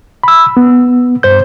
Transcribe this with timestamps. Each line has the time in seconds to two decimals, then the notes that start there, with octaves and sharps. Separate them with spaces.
0.24 B5 E6
0.57 B3
1.23 G2 C5 G6